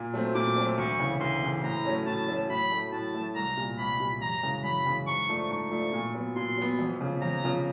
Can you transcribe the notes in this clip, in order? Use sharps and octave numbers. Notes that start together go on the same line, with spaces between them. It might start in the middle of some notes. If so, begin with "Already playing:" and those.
Already playing: A#2
F#3 A3 C4
A#2 D6
F#3 A3 C4
D2 C#6
C#3 E3
D2 C6
C#3 E3
A2 A#5
F#3 A3 C#4
A2 A5
F#3 A3 C#4
A2 B5
F#3 A3
A2 A5
F#3 A3
C2 A#5
A#2 G3
C2 B5
A#2 G3
F#2 A#5
C#3 E3 G#3
F#2 B5
C#3 E3 G#3
G#2 C#6
F3 A3 D4
G#2 C#6
F3 A3 D4
A#2
F#3 B3
A#2 C6
F#3 B3
F2
C#3 F3
F2 A#5
C#3 F3